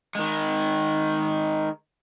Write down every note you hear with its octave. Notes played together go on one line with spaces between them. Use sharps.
D#3 G#3